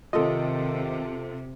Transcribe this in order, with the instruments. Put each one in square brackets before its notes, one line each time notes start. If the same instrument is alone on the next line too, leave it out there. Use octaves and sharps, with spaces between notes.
[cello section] C3 [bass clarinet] D#3 [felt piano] F4 A4 [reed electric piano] D#5